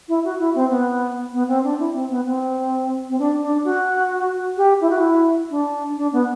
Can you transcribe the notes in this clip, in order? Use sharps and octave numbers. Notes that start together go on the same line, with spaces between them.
E4
F#4
E4
C4
B3
B3
C4
D4
E4
C4
B3
C4
C4
D4
D4
F#4
G4
E4
F#4
E4
D4
D4
B3